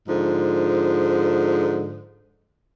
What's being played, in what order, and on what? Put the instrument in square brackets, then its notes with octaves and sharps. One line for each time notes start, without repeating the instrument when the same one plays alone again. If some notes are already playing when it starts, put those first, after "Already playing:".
[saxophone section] G#2 D3 F3